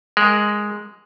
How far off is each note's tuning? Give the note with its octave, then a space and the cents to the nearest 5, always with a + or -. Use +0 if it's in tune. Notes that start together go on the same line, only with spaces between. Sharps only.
G#3 +0 A#4 +0